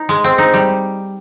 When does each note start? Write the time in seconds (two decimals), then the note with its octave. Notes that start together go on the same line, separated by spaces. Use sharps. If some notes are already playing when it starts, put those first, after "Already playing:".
Already playing: D#4
0.09 G#3
0.24 C4
0.38 D#4
0.54 G3